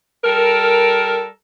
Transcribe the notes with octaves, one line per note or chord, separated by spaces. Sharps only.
G3 A4 A#4